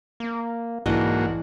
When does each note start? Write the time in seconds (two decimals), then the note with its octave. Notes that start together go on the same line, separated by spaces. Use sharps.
0.20 A#3
0.86 B1 G#2 E3 A#3 D4 F#4 D#5